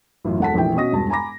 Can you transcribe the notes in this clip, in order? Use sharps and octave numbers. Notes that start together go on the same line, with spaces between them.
A1 F#2 E3 F4
E1 A4 F#5 A5 B6
F1 A#1 E3 G5
B2 C#4 F#4 D#5 D#6 A#6
E1 G2 A5
G#5 A#5 B5 D6 A#6